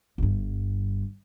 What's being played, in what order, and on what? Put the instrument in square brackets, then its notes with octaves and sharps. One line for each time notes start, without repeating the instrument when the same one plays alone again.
[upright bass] G1 G2